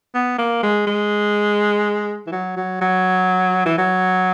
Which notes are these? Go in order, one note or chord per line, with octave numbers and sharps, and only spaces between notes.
B3
A#3
G#3
G#3
E3
F#3
F#3
F#3
E3
F#3